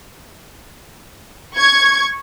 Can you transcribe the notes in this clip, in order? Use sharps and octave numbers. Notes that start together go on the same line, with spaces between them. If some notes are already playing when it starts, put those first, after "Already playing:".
C#6 G#6